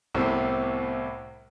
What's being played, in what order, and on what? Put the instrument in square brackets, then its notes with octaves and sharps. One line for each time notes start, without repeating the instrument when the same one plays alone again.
[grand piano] C2 A2 C3 [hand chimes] B3 C5 C7